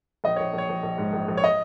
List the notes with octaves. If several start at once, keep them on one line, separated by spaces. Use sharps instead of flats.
A#1 D#5
A#1 C#5
A#1 C#5
A#1
A#1
G#2
A#1
A#1
C#5
D#5